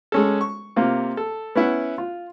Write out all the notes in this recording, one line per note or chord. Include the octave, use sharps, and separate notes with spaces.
G#3 C#4 A4
C#6
C3 A#3 F4
A4
B3 C#4 E4 E5 F#5
F4